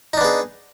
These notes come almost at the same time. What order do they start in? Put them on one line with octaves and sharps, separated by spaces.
D#4 D4 B3 G#4